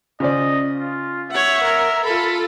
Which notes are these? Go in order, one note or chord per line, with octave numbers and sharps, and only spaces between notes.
C#3 C5 D5 D#5
F4
C#5 E5 F#5
A#4
F4 A4 B5